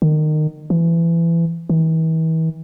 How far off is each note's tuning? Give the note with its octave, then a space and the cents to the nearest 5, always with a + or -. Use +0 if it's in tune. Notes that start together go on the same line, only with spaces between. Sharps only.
D#3 -25
E3 +25
E3 -40